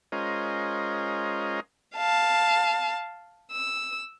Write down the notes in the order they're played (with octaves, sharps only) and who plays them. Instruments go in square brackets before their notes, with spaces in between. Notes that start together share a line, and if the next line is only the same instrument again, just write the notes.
[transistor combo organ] G#3 C#4 F4 A#4 C5 D#5
[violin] F5 A5
E6